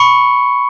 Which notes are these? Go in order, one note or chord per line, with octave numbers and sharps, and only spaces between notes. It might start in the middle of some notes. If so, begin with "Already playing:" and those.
Already playing: B5 C#6 C#7